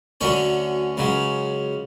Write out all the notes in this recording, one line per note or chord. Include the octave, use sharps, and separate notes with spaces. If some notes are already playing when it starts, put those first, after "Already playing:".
D2 D3 F#3 C#4 C#5
C#2 C#3 F#3